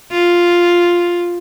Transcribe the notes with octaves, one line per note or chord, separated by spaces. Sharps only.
F4